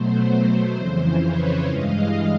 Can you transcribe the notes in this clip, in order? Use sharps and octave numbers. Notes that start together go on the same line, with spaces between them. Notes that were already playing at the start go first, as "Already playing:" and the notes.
Already playing: B2 F#3 A3 C5
C5
F2 C#3 E3
B4 C#5
G2 E3 G#3 D#5 F5